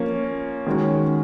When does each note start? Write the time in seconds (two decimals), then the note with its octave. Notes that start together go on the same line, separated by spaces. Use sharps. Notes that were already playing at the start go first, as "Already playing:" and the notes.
Already playing: F3 A#3 C#4
0.66 D#3 G#3 C#4 F#4